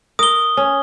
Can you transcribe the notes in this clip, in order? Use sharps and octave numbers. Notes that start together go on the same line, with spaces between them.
A#4 D#6 G7
C#4